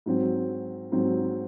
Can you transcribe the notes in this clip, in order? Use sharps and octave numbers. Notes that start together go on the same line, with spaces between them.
G#2 F#3 C4
G#2 F#3 C4